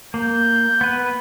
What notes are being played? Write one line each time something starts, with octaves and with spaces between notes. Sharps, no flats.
A#3 G6
B3 B4